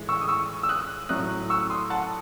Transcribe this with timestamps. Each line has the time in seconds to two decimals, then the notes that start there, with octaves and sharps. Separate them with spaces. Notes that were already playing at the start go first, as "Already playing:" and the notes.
Already playing: A2 E3 G#3
0.09 C#6 E6
0.21 D#6
0.28 C#6 E6
0.63 E6
0.69 D#6 F#6
1.09 A2 F#3 A3 D#6 F#6
1.50 C#6 E6
1.70 C6 D#6
1.90 F#5 A5